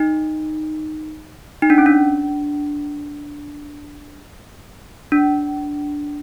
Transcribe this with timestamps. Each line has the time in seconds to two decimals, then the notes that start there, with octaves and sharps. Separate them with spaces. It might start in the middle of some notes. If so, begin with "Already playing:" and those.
Already playing: D#4
1.62 D#4
1.70 D4
1.78 C#4
1.86 D4
5.12 D4